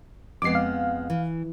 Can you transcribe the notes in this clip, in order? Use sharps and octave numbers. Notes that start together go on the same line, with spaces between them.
F2 G#3 B3 D6 C7
F5
E3